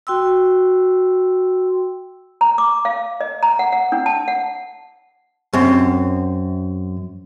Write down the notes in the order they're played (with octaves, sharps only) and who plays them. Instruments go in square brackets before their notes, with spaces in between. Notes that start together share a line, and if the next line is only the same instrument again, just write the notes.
[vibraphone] F#4 G5 C6 E6
[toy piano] A#5
D6
F5
D#5
A#5
F#5
F#5
D4
A5
F#5
[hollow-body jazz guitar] F#2 C4